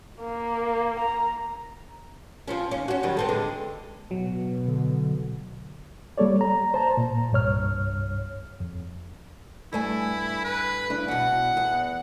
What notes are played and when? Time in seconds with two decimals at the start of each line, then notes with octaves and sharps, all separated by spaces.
0.22 A#3
0.99 A#5
2.48 F3 C4 C#4
2.71 D#2 C#4
2.88 C#4 F#4
3.03 D#3 F#3 G3
3.17 B3 C4 A4
3.29 D3 G#3
4.11 B2 F#3
4.68 D3
6.18 G3 A#3 A4 C#5 D5
6.41 A#5
6.74 C5 A5 A#5
6.97 A#2
7.32 C2 G2 C#5 F6
8.60 F2
9.73 G2 A3 E4 G#5
10.44 B4
10.90 C#3 D4 E4
11.08 E2 B2 F#5
11.57 E2